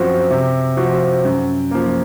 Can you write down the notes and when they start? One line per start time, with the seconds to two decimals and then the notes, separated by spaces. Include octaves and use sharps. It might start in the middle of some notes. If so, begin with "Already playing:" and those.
Already playing: F#2 F3 C4 F#4
0.30 C3
0.77 F3 C4 F#4
1.25 F#2
1.71 F3 A#3